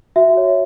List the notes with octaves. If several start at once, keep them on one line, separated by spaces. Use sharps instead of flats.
F#4 E5
C#5